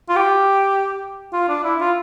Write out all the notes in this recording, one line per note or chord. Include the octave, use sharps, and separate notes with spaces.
F4
G4
F4
D4
E4
F4